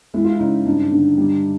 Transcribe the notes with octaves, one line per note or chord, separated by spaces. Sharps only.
G#3 E4
F4
E4
C#3 D#4
G2 D#4
D3
G3